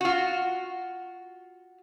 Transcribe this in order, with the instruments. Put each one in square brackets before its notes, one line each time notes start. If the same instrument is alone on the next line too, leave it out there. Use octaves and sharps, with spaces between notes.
[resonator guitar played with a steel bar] F4 F#4